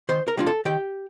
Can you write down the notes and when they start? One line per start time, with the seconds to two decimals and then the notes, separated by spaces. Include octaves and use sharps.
0.09 D#3 C5 C6
0.28 A#4 A#5
0.37 G3 A#3 D4 F4
0.46 A4 A5
0.65 D#3 G4 G5